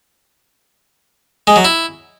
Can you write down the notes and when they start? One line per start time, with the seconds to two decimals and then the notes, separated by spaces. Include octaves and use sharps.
1.47 G#3
1.56 F#3
1.65 E4